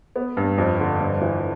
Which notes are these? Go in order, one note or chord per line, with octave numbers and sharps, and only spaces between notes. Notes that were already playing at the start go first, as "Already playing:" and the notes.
B3
G2
F2
D3
G2
E3